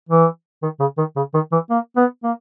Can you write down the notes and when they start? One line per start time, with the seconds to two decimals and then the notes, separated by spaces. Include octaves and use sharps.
0.09 E3
0.62 D#3
0.80 C#3
0.98 D#3
1.16 C#3
1.34 D#3
1.52 E3
1.70 A#3
1.96 B3
2.23 A#3